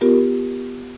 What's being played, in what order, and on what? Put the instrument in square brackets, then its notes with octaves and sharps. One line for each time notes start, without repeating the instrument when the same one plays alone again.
[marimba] B3 F4 G4 A#4